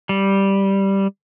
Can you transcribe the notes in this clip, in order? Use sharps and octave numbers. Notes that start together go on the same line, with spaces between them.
G3